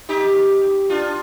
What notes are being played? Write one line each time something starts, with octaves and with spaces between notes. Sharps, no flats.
D#4 G4
D4 F4